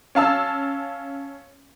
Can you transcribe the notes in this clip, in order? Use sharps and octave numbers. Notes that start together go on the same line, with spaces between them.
C#4 F5 A5 E6